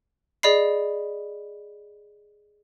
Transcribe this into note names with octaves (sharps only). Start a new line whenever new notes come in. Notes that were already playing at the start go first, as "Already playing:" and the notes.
G#4 D5 D#5 B5 C7